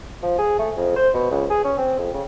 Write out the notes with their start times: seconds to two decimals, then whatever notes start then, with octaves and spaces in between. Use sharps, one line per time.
0.23 F3
0.38 G#4
0.59 A3
0.77 F2
0.96 C5
1.14 B2
1.31 C#2
1.50 G#4
1.64 C#4
1.77 C4
1.99 F2
2.14 C#3